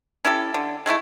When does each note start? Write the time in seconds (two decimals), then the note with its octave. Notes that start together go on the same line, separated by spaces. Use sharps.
0.25 C#4 E4 G4 A4
0.54 D3
0.86 G#3 A3 C#4 E4